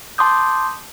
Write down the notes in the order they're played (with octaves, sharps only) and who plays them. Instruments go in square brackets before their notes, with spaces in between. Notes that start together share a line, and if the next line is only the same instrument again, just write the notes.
[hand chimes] A5 C6 D6 D#6 G6